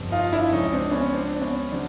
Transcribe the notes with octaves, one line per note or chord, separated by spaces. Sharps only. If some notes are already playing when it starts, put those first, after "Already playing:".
Already playing: G1 F2 C3
D#4 F4
D4 E4
C#2 C#3 F3 C#4 D#4
C4 D4
B3 C#4
C4 D4
D4
B3 C#4
C#3 F#3 C4 D4